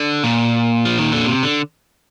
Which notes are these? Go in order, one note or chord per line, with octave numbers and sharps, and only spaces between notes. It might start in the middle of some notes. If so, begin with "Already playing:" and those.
Already playing: D3
A#2
F3
D#3
D3
C3
D3